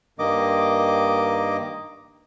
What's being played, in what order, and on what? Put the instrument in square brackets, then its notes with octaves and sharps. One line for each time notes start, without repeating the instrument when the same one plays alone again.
[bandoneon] G2 D#3 A#3 D#5 D6